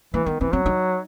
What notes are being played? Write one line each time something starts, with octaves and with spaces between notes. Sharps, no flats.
E3 A#3
D#3 B3
E3 C4
F#3 C4
D#4